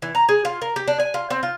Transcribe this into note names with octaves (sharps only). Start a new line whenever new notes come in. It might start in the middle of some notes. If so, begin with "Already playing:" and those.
E3
A#5
G#4
F4
A#4
G4
D4
G#5
F4
C4
F4